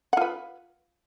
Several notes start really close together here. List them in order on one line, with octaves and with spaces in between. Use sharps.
F#5 F4 B4